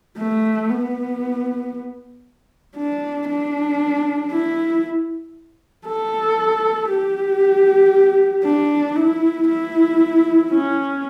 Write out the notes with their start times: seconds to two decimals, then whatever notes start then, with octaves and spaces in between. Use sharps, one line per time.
0.18 A3
0.70 B3
2.76 D4
3.28 D4
4.31 E4
5.86 A4
6.90 G4
8.44 D4
8.96 E4
9.48 E4
10.51 C#4